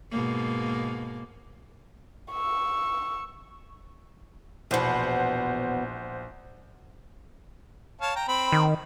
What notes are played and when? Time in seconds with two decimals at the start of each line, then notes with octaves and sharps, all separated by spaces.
0.11 G#2 B2 A#3
2.32 C#6 E6
4.71 A#1 E2 B2 C5 F#5
8.01 C#5 F5 A5
8.16 G5 A#5
8.28 C4 B5
8.52 D#3